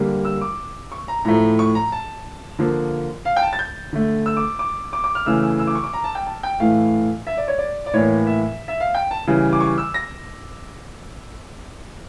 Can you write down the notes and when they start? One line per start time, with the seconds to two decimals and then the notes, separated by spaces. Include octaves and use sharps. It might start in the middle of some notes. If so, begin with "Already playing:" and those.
Already playing: D3 G3 A#3
0.25 E6
0.41 D6
0.92 C#6
1.08 A#5
1.25 A2 F3 A3 A#5
1.59 C#6
1.75 A#5
1.92 A5
2.59 D3 F3 A#3
3.25 F5
3.37 G5
3.42 A5
3.53 A6
3.59 G6
3.93 D3 A3
4.26 E6
4.37 D6
4.59 D6
4.93 D6
5.04 D6
5.15 F6
5.26 C#3 E3 A3 E6
5.43 E6
5.59 E6
5.67 D6
5.75 C#6
5.84 D6
5.94 A#5
6.04 A5
6.15 G5
6.26 A5
6.43 G5
6.60 A2 E3 A3 F5
7.27 E5
7.37 D5
7.48 C#5
7.58 D5
7.86 D5
7.94 A2 E3 A#3 C#5
8.27 E5
8.68 E5
8.80 F5
8.95 G5
9.11 A5
9.27 C#3 E3 G3
9.53 D6
9.61 C#6
9.78 E6
9.94 A#6